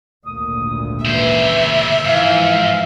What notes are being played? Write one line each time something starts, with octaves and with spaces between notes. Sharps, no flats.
G#1 D2 A#2 D#6
C#3 E3 C5 E5
G#2 E3 F3 F5